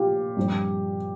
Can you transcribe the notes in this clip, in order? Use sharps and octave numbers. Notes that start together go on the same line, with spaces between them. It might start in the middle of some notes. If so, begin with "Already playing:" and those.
Already playing: A#2 F4 G4
G2 F3 C4